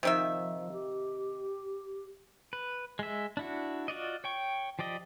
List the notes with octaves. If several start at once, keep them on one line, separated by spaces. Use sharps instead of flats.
C3 D#3 F3 E5
G4
B4
G#3 E5
D4 E4 F#4
F4 F#4 D5 D#5
C#5 G5 C#6
F3 G4 D5 D#5